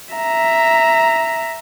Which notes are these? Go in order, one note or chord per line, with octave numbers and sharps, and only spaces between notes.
E5 A#5